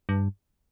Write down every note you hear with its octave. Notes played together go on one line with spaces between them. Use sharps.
G2